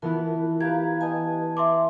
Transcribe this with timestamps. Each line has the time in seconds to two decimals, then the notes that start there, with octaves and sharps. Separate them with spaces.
0.02 E3 B3 E4 F4 A#4 A5
0.61 G4 B4 F5 A#5 G#6
1.01 B4 D#5 G#5 A5
1.57 E5 C6 D6